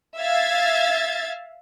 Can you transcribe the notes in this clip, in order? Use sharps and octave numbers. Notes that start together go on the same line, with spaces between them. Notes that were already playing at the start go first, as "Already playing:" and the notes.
E5 F5 G#6 A6